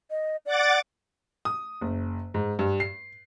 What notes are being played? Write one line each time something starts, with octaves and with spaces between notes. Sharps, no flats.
D#5
D5 F#5 D6 A6
D#6
F#1
G#2
G2
C7